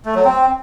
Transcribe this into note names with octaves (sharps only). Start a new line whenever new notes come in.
A3
F#3
C4